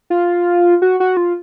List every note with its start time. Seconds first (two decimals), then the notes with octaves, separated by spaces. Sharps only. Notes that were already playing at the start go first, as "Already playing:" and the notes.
0.10 F4
0.82 F#4
1.00 F#4
1.17 F4